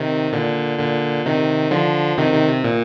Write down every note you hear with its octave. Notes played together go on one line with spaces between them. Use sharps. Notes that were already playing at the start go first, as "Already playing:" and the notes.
Already playing: C3 D#3
A#2 D3
A#2 D3
C3 D#3
D3 F3
C3 D#3
C3 D#3
C3
A#2